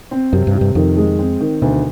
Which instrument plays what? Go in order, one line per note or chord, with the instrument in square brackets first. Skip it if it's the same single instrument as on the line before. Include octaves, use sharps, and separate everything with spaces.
[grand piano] C4
[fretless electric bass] F#2 [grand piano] C3
[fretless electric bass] G2
[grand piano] C3
[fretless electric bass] G2
[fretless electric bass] F2 [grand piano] D#3
[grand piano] G#3
C4
D#3
[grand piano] D2 [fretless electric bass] B2